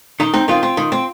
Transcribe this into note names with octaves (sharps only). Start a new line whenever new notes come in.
D#3 D#4
C4 D#4
D#3 C4 F4
C4
D#3
C4